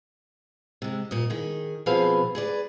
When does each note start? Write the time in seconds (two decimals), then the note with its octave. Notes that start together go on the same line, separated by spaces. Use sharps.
0.82 C3 G#3
1.11 A#2 D#5
1.30 D#3 G#4
1.86 B2 F3 C4 G#4 B4 F5
2.35 G#4 B4 D5